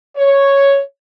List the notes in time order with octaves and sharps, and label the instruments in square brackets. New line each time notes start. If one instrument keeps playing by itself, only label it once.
[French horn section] C#5